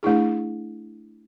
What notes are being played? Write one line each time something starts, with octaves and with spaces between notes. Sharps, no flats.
A3 D4 E4 G#4